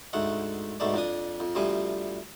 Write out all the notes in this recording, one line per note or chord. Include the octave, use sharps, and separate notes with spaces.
D2 G#2 A3 F#5
G#2 B2 A3 D5
F2 D4 D#6
F2
D2 C3 F3 G3 G#5